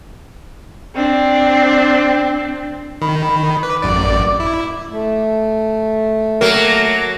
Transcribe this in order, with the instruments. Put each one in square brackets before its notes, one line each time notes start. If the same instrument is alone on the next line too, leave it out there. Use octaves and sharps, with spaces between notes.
[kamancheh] C4 D4
[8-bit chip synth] D#3 [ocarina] B5
[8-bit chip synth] B4 [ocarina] D6
[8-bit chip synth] A1 F#2 D5
E4
[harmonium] A3
[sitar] F#3 A#3 [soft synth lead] A#4